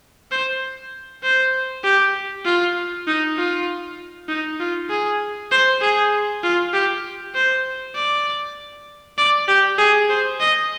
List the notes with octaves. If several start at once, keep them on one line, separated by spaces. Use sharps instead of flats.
C5
C5
G4
F4
D#4
F4
D#4
F4
G#4
C5
G#4
F4
G4
C5
D5
D5
G4
G#4
C5
D#5